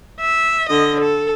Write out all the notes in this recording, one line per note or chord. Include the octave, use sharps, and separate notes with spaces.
E5
D3 D#5
A4